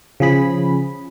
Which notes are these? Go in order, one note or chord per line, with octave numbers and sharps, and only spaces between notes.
C#3 F3 G#4 B5